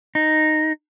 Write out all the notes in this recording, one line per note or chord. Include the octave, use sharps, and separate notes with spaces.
D#4